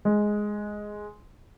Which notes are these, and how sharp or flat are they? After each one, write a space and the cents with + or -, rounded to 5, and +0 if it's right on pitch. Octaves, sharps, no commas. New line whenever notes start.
G#3 +5